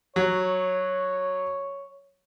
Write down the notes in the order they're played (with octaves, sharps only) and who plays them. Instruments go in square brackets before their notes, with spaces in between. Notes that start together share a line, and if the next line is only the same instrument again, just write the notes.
[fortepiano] F#3 [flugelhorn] C#5